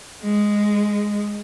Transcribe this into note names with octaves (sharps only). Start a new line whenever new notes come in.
G#3